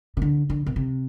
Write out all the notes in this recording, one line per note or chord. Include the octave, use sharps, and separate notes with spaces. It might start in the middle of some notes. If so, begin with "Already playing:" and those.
C3
D3
D3
B2
C3